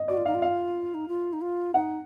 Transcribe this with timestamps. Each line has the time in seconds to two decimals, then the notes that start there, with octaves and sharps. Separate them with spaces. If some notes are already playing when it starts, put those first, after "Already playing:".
Already playing: D#5
0.08 F#4 D5
0.17 F4
0.25 D#4 F5
0.34 F4
0.42 F5
0.94 D#4
1.08 F4
1.33 D#4
1.41 F4
1.74 D#4 F#5